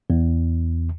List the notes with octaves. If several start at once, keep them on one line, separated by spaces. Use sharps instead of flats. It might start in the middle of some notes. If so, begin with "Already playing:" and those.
E2